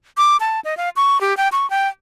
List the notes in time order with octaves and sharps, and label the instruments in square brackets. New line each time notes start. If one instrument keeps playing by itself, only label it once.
[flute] D6
A5
D#5
F5
C#6
G4
G5
C#6
G5